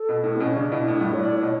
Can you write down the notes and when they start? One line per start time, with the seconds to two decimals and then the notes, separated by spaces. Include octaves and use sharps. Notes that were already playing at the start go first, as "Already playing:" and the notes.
Already playing: A4
0.09 B2
0.24 A2
0.36 B3
0.40 B2 C#4
0.57 C#3 D4
0.72 B2 E4
0.88 A2 D4
1.00 G2
1.04 A2 E4
1.13 C#5
1.20 A2 D5
1.36 C#5
1.41 B2